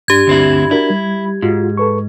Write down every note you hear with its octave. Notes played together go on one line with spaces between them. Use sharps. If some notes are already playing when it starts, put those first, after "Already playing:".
G2 D4 G4 G#6
D2 C4 E4
D4 E4 F#4 A#4
G3
G#2 F4 F#4
A4 B4 C#6